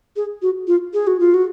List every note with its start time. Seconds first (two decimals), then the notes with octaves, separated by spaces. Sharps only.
0.16 G#4
0.42 F#4
0.67 F4
0.93 G#4
1.07 F#4
1.20 F4
1.34 F#4